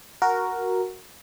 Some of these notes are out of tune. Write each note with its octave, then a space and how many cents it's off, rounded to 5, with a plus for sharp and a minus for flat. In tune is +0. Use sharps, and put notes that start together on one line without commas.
F#4 +0 A#4 +0